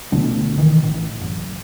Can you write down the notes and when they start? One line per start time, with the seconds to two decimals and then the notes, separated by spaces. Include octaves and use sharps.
0.12 C#2 B2 D3 A3
0.58 D#3 E3
0.83 A1
1.21 F#1